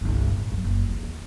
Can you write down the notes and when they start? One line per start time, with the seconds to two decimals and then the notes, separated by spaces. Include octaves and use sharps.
0.01 G1 C2
0.27 A2
0.52 D#3 F#3
0.64 F#1
0.90 E2
1.03 E2